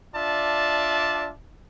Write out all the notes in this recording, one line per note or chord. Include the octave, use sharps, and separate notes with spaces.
D4 F4 D5 E5 A5